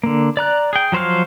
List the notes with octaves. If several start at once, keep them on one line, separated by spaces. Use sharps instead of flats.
D3 A#3
D5 A#5 F#6
G#4 G5
F3 F#3 C5 C#5 F5